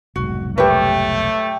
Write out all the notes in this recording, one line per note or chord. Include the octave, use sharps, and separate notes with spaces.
F1 B1 G#2 F#4
A3 G4 A#4 B4 C#5